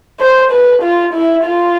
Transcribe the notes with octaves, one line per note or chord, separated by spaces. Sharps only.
C5
B4
F4
E4
F4